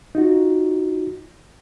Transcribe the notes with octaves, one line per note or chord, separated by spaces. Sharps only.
D#4 F4 F#4